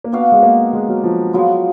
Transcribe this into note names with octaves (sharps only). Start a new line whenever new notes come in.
A#3
B3 D4 F#4 D5 F5
G#3
A#3
G#3
F#3
F3
F3 F#3 G#3 B3 F4